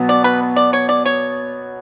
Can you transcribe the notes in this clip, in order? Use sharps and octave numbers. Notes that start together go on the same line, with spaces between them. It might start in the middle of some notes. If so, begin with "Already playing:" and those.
Already playing: B2 F#3 B3
D5
B4
D5
C#5
D5
C#5